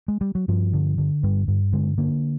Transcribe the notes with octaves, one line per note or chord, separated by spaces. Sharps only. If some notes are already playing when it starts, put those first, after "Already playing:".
G#3
G3
F#3
G2 F3
D3
D3
G2 G3
G2
D3 G#3
D3 A#3